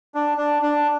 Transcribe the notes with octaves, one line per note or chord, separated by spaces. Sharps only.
D4
D4
D4